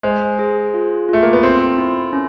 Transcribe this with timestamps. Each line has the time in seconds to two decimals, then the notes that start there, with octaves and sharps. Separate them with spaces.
0.03 G#3 C5
0.39 G#4
0.74 F4
1.09 A3 F4
1.23 A#3
1.33 B3
1.43 C4 A4
1.78 E4
2.13 C#4